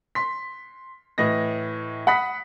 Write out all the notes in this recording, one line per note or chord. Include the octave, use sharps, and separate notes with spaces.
C6 B6
A2 E3 D#5 A#6
F#5 B5 D#6 B6